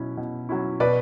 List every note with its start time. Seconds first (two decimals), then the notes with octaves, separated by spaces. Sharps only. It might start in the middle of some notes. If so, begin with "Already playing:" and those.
Already playing: B2 F#3 C#4 E4
0.17 B2
0.49 F#3 C#4 E4
0.80 B2 B4 D5